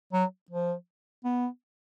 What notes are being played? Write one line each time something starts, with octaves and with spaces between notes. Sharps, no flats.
F#3
F3
B3